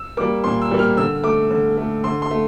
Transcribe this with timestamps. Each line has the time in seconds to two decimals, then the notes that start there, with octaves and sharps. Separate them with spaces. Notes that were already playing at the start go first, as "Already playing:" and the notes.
Already playing: E6
0.17 G3 A#3 D6
0.44 A#2 C6
0.62 E6
0.71 G3 A#3
0.79 F6
0.97 D3 E6
1.24 A3 D6
1.51 D3
1.77 A3
2.04 D3 C6
2.22 C6
2.31 A3